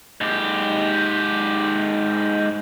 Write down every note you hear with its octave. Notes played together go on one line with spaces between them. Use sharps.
G#2 G4